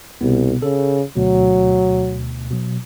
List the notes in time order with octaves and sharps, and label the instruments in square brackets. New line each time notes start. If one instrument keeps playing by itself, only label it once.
[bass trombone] C2 [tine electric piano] B2 B3
[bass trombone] C#3 [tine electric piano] A4
[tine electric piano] D2 B2 [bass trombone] F#3
[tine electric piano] B2 F#3